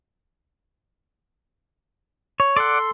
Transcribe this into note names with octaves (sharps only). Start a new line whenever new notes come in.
C#5
A4 D5 F#5 C6